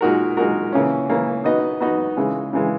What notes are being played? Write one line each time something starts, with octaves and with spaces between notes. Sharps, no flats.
A#2 G#3 D#4 F#4 A#4
A#2 G#3 D#4 F#4 A#4
C#3 E3 A#3 C#4
C#3 E3 A#3 C#4
B3 D#4 F#4 B4 D#5
B3 D#4 F#4 B4 D#5
C#3 E3 G#3
C#3 E3 G#3